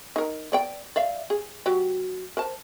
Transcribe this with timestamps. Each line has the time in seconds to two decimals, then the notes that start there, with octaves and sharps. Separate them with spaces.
0.16 D#4 A#4
0.52 B3 D5 G5
0.96 D5 E5 F5
1.30 G#4
1.66 F#3 F#4 G4
2.37 A#4 C5 A5